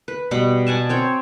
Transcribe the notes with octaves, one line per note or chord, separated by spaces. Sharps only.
B4
B2 G3 F#5 B5
D5 F#5 G#5 A5
C4 C#5 G5